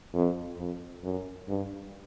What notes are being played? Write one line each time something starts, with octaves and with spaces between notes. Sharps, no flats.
F2
F2
F#2
G2